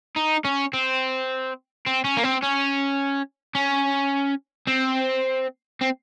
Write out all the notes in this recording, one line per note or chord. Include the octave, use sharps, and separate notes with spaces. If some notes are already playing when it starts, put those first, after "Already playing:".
D#4
C#4
C4
C4
C#4
A#3
C4
C#4
C#4
C4
C4